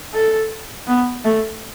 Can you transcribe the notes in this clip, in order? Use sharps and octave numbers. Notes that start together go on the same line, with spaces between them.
A4
B3
A3